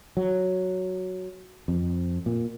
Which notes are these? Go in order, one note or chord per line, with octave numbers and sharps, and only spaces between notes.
F#3
F2
A#2